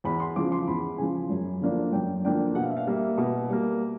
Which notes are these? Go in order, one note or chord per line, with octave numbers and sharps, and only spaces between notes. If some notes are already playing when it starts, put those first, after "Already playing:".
E2 B5
C6
C#3 F3 D6
C6
E2 B5
C#3 F3 G#5
F#2
D3 F3 A#3 D4
F#2 G5
D3 F3 A#3 D4 G5
B2 F#5
F5
E5
F5
G3 A#3 E5
B2
G3 A#3